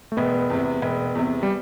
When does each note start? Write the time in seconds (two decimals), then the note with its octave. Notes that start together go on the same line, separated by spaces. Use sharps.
0.12 A3
0.17 E1 B3
0.50 E2 C3
0.82 E1
1.15 E2 C3
1.43 G3